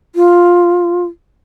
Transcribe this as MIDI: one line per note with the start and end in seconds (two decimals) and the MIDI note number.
0.15 1.03 65